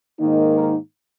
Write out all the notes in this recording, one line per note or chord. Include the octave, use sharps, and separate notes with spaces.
G#2 D#3 A#3 D#4
A#4